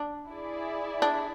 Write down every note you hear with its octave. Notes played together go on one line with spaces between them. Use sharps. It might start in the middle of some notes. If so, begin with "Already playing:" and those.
Already playing: D4
E4 G#4 D5
D4